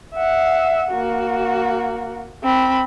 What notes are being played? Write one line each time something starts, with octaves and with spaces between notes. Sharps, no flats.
E5 F#5
A#3 F#4
C4 B5